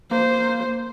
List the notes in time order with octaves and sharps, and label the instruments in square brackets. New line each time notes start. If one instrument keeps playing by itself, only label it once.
[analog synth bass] A#3 [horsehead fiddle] C5